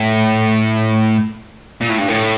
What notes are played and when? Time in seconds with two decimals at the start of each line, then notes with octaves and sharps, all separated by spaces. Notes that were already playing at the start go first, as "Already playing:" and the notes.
Already playing: A2
1.81 A#2
1.90 A2
1.98 G2
2.08 A2